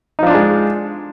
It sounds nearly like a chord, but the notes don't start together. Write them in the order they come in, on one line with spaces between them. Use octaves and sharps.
D#4 F3 D4 F4 G#3